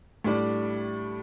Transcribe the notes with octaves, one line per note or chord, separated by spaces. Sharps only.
A2 G3 D4